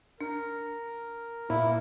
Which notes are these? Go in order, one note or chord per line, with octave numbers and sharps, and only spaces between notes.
D4 A#4
A#2 E4